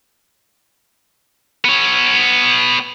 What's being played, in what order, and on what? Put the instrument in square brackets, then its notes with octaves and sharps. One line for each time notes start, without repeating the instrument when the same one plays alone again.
[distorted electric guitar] B3 C#5